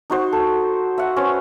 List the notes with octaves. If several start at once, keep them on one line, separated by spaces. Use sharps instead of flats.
D#4 F#4 C5
A4
E5 F#5
C#4 B4 C5